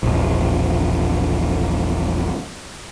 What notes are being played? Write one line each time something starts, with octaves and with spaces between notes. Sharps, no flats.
E1 A#1